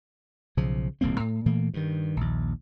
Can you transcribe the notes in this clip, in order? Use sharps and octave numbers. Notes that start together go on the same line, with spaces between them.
B1 C#3 F3
D#1 C2 A#3 C4
A2
A#2 E3 A3 A#3
G2 D#3
A#1 D#2